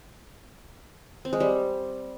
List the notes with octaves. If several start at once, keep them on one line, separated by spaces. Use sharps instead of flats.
C4
G#3
G3